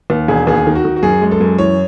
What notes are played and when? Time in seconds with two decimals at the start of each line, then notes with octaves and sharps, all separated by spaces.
0.10 D#2
0.28 E1 G#4
0.47 D#2 G#4
0.67 D#3
0.75 F#4
0.85 D#3
0.96 F#4
1.03 F#2 G#4
1.22 G#3
1.31 A4
1.41 F#2
1.58 E3 C#5